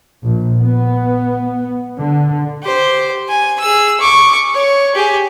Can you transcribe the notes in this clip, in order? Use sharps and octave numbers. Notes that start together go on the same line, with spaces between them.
A#1
B3
D3
G4 C5
G#5
G#4 E6
C#6 D6
C#5
G4 G#4